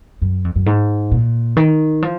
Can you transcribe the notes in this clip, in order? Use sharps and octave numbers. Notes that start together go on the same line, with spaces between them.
F#2
F2
F#2
G#2
A#2
D#3
F3